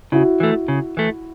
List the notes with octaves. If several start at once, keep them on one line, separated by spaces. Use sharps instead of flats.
C#3 E4 F#4
E3 A3
C#3
E3 A3